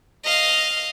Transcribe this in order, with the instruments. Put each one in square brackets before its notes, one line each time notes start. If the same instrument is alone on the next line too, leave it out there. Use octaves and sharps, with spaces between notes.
[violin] D#5 F5